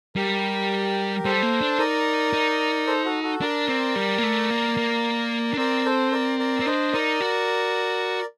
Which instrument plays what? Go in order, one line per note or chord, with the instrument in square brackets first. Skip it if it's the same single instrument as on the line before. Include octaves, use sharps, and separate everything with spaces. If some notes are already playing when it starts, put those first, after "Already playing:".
[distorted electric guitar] G3 [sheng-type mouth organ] G4 A#4
[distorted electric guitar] G3 [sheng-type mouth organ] A4 C5
[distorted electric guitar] A#3
D4
[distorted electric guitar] D#4 [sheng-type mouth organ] A#4 D5
[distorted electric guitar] D#4
[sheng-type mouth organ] A4 C5
F#4 A4
F#4 A4
[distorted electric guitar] D4 [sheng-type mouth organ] A#4 D5
[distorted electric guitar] C4
G3
A#3
A3
A#3
A#3
D4
[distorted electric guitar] C4 [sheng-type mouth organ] A#4 D5
[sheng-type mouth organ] A4 C5
A#4 D5
A#4 D5
[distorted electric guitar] C4
[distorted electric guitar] D4 [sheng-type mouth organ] C5 D#5
[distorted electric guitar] D#4 [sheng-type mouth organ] A#4 D5
[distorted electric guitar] F#4